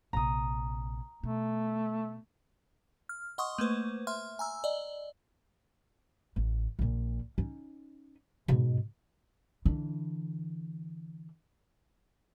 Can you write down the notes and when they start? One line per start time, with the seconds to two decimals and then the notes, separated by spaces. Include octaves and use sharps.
0.13 A#1 C3 A#5 D#6
1.23 B2 A3
3.09 F6
3.38 D#5 F#5 C6 C#6 D#6
3.58 A3 A#3 B4 C5
4.07 E5 C6 F6
4.39 G#5 A#5 E6
4.64 D5 D#5
6.36 A1
6.79 A#1 A#2
7.38 C#4 D#4
8.48 G#2 B2
9.65 D3 E3